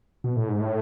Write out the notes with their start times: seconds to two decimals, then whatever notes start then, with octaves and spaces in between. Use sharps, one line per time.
0.24 B2
0.36 A2
0.48 G#2
0.61 A2